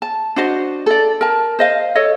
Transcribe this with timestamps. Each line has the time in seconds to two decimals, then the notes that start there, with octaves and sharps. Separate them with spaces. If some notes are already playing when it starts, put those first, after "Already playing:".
0.02 A5
0.36 D4 F#4 C5 D#5
0.86 A4 D5
1.21 A#4 A5
1.59 C5 D#5 F5
1.95 A4 C#5 D#5